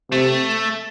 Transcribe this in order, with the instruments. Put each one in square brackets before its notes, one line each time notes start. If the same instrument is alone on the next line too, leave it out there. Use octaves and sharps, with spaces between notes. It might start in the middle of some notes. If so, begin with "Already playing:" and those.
[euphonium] C3 [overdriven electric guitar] A3